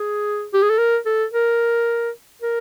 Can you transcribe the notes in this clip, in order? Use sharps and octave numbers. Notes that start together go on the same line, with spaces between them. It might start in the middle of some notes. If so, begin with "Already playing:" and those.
Already playing: G#4
G4
G#4
A4
A#4
A4
A#4
A#4